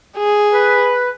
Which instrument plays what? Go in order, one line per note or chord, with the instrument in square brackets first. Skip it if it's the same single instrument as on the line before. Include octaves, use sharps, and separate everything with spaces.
[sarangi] G#4
[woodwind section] B4